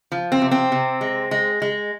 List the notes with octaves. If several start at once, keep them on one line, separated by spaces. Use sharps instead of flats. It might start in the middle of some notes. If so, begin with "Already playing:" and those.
F3
C4
C3
C4
C3
G#3
G#3
G#3